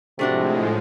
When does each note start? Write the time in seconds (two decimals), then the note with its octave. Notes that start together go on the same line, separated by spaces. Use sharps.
0.19 A2 C3 F3 G#3 A3 D4 F#4